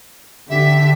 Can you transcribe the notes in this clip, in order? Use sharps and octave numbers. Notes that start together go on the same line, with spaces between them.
D3 G4 E5